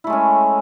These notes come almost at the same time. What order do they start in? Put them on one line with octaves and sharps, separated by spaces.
E4 A3 G#3 C#4